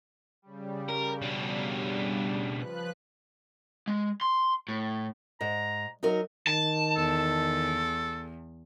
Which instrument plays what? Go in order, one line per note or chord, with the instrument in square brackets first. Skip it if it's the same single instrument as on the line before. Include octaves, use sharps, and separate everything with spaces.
[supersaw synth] C#3 G3
[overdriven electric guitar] A#4
B2 D4
[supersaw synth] F3 B4 F#6
[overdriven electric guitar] G#3
C6
A2
[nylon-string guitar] G#2 [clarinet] A#5
[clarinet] F#3 [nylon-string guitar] D#4 F#4 A#4
[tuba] D#3 [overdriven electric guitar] A5
[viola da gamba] E2 [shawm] A4